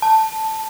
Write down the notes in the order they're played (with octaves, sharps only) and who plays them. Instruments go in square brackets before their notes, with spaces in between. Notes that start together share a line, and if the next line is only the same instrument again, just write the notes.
[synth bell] A5